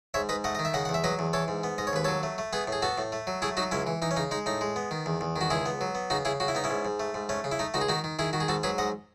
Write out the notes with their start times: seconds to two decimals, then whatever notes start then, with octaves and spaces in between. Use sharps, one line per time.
0.14 G#2 C#5 E5
0.29 G#2 B4 D#5
0.44 A3 D#5 F#5
0.55 D#3 D#5
0.65 E5
0.74 C#3 D#5 F#5
0.85 E2 F#5
0.94 E5
1.04 F#3 B4 D#5
1.19 E2
1.33 E3 A4 C#5
1.48 G#2
1.64 B3
1.78 G#2 D#5
1.87 C#5
1.93 D#2 B4
2.04 F#3 A4 C#5
2.23 A3
2.38 A3
2.53 B3 G#4 B4
2.67 A2 G#4
2.82 B3 F#4 A4
2.98 A2
3.12 A3
3.27 F#3
3.42 A3 E4 G#4
3.57 F#3 D#4 F#4
3.71 C#2 C#4 E4
3.87 E3
4.02 E3 D#4
4.11 C#4
4.17 C#3 D#4
4.31 G#3 D#4
4.46 A2 D#4
4.61 G#3
4.76 B3
4.91 D#3
5.06 E2
5.21 E2
5.36 D#3
5.41 F#4
5.50 C#2 E4 G#4
5.66 B3
5.81 F#3
5.95 B3
6.10 C#3 D#4 F#4
6.25 C#3 E4 G#4
6.40 C#3 F#4
6.48 E4
6.55 B3 D#4
6.64 C#4 E4
6.70 G#2
6.85 G#2
7.00 A3
7.14 G#2
7.29 A3 C#4
7.44 C#3
7.52 E4
7.59 A3 D#4
7.74 C#2 D#4 F#4
7.81 G#4
7.89 D#3 D#4 F#4
8.04 D#3
8.19 D#3 E4 G#4
8.33 D#3 F#4
8.41 G#4
8.49 G#2 F#4 A4
8.63 F#3 G#4 B4
8.78 G#2 D#5 F#5